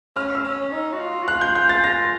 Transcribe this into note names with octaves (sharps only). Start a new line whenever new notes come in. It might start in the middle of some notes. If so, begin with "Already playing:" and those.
C#4 F6
E6
C#4
D#4
F#4
F4
F#4
F4 F#6
G6
G6
A6
A#6